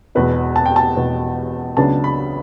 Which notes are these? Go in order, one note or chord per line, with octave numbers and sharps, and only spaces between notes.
E1 E2 B2 B4
A5
G5
A5
E1 E2 B2
C#2 C#3 F#3 B3 D4 A5
B5